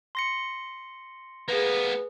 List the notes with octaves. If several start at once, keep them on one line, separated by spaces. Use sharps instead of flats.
C6 A#6 C#7
A#3 B3 G#4 B4